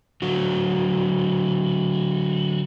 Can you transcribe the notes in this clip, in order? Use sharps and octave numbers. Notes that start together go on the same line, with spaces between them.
D3 F#3 F#4